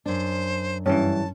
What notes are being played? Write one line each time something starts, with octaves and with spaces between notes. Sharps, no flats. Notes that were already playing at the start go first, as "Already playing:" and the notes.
F#2 D4 C5
G2 E3 C#4 A5